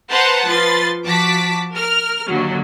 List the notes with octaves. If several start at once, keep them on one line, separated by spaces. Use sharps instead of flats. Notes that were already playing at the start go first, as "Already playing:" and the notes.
B4 C5 F#5 A5 A#5 C6
F3 B4 C6 A6
F3 F#4 A5 D6 B6
A#4 F6
D#2 D3 F#3